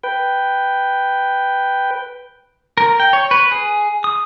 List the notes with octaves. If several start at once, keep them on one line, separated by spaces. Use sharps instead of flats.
B4 G5
A#4
G5
C#5
B4
G#4
D#6